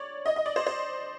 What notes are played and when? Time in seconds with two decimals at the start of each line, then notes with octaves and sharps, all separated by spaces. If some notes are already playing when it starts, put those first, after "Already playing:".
Already playing: C#5 D5
0.26 D#5
0.36 D#5
0.46 D5
0.56 C5
0.67 C5